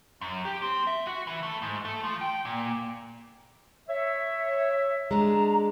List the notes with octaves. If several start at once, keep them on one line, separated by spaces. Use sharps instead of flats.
F#2
G4
C4
E5
F#4
E3
A3
G#2
A3
F3
G5
A#2
C#5 E5
G#3 D4 A#5